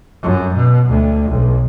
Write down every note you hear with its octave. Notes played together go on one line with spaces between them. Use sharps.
F#2
B2
D2
B1